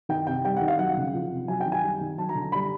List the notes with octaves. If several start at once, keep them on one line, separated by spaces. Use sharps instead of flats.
D#3 G5
C3 G5
G3 G5
F#5
D#3
F5
F#3 F#5
C#3
F3
C3
F#3 G#5
G5
D#3
G#5
G3
D#3
F#3 A5
A#5
D3
A#5
G3 B5